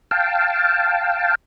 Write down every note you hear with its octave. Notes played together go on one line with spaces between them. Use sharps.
F5 G5 A5